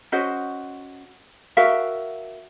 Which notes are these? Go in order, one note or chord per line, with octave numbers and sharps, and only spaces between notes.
C#4 F#4 C5 D#5
F#4 A#4 E5 F5